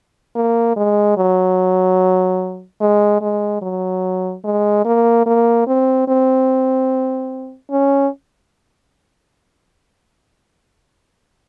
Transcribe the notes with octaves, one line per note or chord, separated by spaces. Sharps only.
A#3
G#3
F#3
G#3
G#3
F#3
G#3
A#3
A#3
C4
C4
C#4